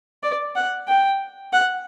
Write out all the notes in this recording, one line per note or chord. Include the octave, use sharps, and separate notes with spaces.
D5
F#5
G5
F#5